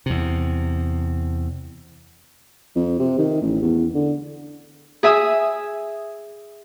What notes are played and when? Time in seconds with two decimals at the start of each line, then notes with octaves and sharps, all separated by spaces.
0.06 E2 C3
2.76 F2
2.99 C3
3.19 D#3
3.42 A1
3.62 E2
3.94 D3
5.03 G#4 E5 G#5 D#6